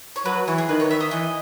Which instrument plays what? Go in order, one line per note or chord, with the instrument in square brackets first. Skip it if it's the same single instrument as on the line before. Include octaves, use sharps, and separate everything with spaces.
[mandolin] C#5
[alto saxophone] F#3 [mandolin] B4
[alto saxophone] E3 [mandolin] C#5
[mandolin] G#4
[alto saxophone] D#3 [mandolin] B4
[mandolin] C#5
E5
D#5
[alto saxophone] E3 [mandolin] D#5